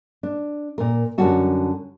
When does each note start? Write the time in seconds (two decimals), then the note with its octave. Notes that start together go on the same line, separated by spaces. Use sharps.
0.23 D4
0.78 A#2 A#4
1.18 F#2 D3 G3 F#4 A5